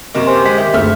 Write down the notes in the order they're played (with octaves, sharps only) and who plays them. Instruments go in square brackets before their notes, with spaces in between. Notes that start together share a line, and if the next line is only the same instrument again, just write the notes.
[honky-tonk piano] F#2 C3 A#3 [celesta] D#5 C#6
[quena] G4 [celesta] C5 G#5 C6
[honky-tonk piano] G#3 [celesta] B6
[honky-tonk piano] D#3 [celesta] E5
[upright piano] F#1 D2 [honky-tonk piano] A3 E5 F6 [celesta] G#4